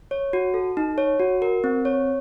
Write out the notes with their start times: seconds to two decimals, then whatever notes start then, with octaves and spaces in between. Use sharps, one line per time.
0.11 C#5
0.33 F#4
0.54 A4
0.77 D#4
0.98 C#5
1.20 F#4
1.42 A#4
1.64 C4
1.85 C#5